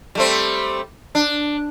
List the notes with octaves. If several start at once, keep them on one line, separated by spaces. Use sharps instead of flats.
G3 A3 C4
D4